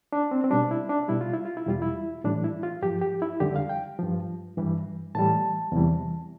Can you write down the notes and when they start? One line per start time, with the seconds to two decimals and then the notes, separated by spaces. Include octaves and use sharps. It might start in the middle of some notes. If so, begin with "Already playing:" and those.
0.13 D4
0.31 C4
0.44 C4
0.50 B2 G3 D4
0.71 E4
0.89 D4
1.08 B2 G3 E4
1.21 F4
1.33 E4
1.45 F4
1.57 E4
1.66 E2 B2 G3 F4
1.82 E4
2.24 A2 E3 G3 D4
2.44 E4
2.63 F4
2.82 G2 F3 G4
3.02 G4
3.22 E4
3.40 F2 D3 G3 G4
3.56 F5
3.69 G5
3.99 G2 F3
4.57 G2 E3 G3
5.15 A2 E3 G3 A5
5.72 E2 C3 E3 G3